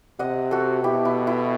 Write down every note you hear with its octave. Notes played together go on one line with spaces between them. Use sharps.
C3 D#5 F#5
F#4 A4
B2 E4 G4
E4
E4